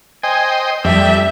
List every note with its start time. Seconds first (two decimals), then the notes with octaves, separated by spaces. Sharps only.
0.23 C5 D#5 G5 G#5
0.84 F2 G3 A3 D4 G4 E5